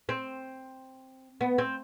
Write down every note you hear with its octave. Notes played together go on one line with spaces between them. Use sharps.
C4
B3
C4